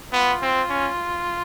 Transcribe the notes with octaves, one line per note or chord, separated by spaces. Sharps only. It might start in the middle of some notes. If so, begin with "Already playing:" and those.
B3 F4
C4
C#4